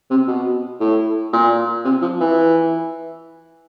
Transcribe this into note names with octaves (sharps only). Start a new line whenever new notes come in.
C3
B2
A2
A#2
C3
F3
E3